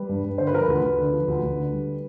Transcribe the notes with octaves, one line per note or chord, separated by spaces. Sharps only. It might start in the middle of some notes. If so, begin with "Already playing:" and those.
Already playing: G3 B4
G2
G2
D3 C5
B4
F3 A#4
B4
D2
D2
D3
F3
D2
D2
D3
G3